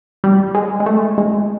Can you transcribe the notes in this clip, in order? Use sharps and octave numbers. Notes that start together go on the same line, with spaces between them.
G3
G#3
G#3
A3
G#3